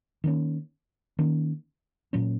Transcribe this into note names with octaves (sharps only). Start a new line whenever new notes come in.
D#3 A#3 C#4
D#3 A#3 C#4
A#2 F#3 A#3 C#4